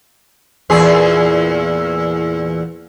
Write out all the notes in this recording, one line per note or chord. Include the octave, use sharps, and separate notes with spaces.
E2 A#2 G#4